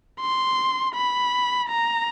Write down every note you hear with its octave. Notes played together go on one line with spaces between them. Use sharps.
C6
B5
A#5